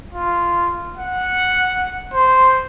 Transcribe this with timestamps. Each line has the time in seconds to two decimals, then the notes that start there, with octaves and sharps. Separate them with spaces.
0.13 F4
0.97 F#5
2.13 C5